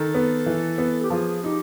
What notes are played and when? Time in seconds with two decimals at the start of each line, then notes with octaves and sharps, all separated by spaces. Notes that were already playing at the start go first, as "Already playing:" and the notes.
Already playing: D#3 A4
0.14 B3
0.46 E3
0.78 B3
1.02 G4
1.10 F3 G#4
1.44 D#4 G4